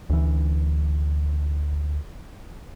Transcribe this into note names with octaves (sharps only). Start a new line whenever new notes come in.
D2 E3